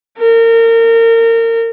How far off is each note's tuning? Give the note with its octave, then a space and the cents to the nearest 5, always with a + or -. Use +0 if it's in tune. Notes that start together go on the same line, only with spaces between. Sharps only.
A#4 -30